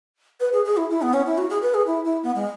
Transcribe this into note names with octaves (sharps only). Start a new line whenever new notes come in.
B4
G#4
G#4
E4
E4
B3
C#4
E4
F#4
G#4
B4
G#4
E4
E4
B3
G#3